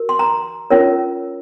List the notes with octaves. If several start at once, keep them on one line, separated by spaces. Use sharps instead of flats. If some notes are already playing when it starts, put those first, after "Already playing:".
Already playing: F#4 A#4
C6
A#5
C#4 F4 A#4 C#5